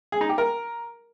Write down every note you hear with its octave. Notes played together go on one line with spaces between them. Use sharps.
G#4
D#4
G4
A#4